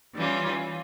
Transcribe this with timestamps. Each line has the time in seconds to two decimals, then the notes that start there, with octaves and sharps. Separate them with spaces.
0.15 E3 G3 C#4 F4